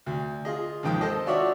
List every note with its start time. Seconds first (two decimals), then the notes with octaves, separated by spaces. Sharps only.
0.06 D2
0.45 F4 G#4 D#5
0.83 D#2 G#2 F3 G5 D#6
1.01 A4 C5 D#5
1.26 D4 F4 F#4 C#5 D5 E5